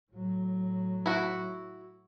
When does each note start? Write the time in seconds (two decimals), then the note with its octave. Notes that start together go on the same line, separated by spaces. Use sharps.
0.12 A2 F#3
1.06 E4 F#4